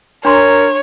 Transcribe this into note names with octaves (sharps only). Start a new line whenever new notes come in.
D4 A#4 C#5 A#5 C6